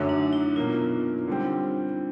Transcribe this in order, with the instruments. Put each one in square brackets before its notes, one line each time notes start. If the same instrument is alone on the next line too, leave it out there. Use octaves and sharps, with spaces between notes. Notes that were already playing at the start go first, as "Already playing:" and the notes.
Already playing: [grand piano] F#2 D3 F#3 A3 [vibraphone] D4
[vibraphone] D#4
E4
[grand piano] B2 F#3 A#3 [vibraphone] F4
[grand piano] D3 G3 C4